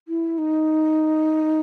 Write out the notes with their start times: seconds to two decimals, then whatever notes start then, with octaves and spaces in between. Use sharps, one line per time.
0.08 E4
0.38 D#4